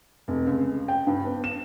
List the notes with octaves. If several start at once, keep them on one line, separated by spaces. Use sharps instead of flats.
F1
C#2
G5
G2
B3
E7